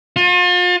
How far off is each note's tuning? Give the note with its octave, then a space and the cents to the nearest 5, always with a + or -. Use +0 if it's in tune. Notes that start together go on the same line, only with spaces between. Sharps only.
F4 +40